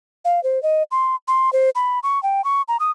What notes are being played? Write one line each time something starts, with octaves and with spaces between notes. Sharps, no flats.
F5
C5
D#5
C6
C6
C5
B5
C#6
G5
C#6
A#5
D#6